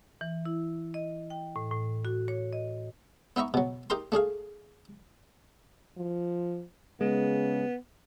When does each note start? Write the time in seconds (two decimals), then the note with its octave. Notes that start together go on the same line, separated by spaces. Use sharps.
0.21 E3
0.45 E4
0.94 D#5
1.30 G5
1.56 A2
1.71 A2
2.05 F#4
2.28 C#5
2.53 D#5
3.36 B3 D#4 E5 A#5 C#6
3.54 B2 F#3
3.90 D#4 G4 A#4 A#5 C6
4.12 A3 D4 G#4 F5
5.98 F3
7.01 C#3 G#3 B3